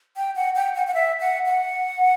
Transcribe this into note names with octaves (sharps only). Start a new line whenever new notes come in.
G5
F#5
G5
F#5
F#5
E5
F#5
F#5